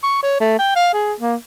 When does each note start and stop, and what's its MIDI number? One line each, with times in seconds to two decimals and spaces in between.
0.03 0.21 85
0.23 0.40 73
0.40 0.54 57
0.59 0.72 79
0.76 0.91 77
0.93 1.13 68
1.20 1.35 58